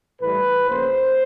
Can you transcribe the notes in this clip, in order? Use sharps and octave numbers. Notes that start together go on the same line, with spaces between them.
A2 E3 G3 B4
C#3 F3 A#3 C5